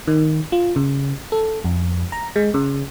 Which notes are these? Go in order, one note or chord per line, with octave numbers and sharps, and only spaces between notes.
D#3
F4
C#3
A4
F2
A#5
G#3
C#3